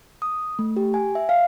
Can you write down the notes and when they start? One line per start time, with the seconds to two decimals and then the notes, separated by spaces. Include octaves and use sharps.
0.22 D#6
0.59 A3
0.76 G4
0.94 G#5
1.15 E5
1.29 F5